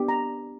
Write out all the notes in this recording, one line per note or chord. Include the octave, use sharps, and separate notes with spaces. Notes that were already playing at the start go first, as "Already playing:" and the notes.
Already playing: B3 D4 G4
A#5